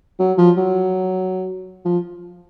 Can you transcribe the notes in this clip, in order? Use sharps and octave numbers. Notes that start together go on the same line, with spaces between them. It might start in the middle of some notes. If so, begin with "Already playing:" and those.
F#3
F3
F#3
F3